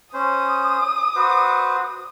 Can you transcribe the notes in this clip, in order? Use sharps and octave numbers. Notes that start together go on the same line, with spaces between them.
C#4 C5 D#6
F#4 B4 C5